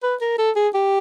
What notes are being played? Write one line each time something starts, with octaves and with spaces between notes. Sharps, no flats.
B4
A#4
A4
G#4
G4